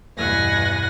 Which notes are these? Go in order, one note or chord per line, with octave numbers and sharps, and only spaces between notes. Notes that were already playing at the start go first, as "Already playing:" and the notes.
E2 G2 B2 F#5 G#5 A#6